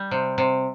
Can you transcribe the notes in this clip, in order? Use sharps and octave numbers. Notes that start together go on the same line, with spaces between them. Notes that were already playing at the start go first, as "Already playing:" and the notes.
Already playing: G3
C3
C3